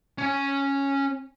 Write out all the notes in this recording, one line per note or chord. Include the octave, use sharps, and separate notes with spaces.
C#4 G#5